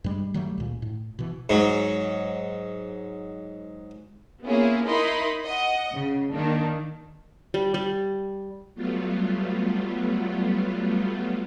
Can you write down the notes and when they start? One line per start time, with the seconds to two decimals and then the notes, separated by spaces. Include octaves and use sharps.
0.04 G2 G3 G#3
0.34 D#3 F#3 G3 A3
0.58 C#2 A#2
0.82 A2
1.19 B2 E3
1.49 G#2 F#3
4.45 A#3 B3 C#4 E4 F4 G#4
4.87 D#4 E4 A#4 D#5 B5 C6
5.45 D#5 F#5
5.94 C#3
6.33 D#3 A#3 D4
7.54 G3
7.74 G3
8.75 F#3 G3 A3 B3 F4